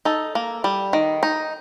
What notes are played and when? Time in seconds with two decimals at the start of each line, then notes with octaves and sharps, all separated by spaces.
0.05 D#4 A4
0.35 A#3
0.64 G3
0.93 D#3
1.23 D#4